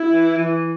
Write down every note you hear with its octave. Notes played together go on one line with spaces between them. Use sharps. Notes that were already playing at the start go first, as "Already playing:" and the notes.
Already playing: E4
E3
E3